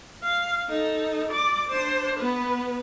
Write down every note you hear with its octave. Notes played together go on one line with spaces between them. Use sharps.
F5
D#4 A4
D5 D6
D4 C5
B3 B4